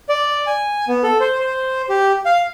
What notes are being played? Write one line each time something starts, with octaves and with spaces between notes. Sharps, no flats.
D5
G#5
B3
A4
C5
C5
G4
F5